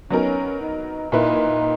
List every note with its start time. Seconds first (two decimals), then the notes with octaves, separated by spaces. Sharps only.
0.10 F#3 B3 C#4 D#4 A#4
0.61 D#4
1.12 A#2 A#3 D#4 E4 B4